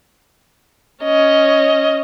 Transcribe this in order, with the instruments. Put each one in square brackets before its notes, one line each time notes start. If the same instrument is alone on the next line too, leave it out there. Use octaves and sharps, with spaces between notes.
[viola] C#4 D#5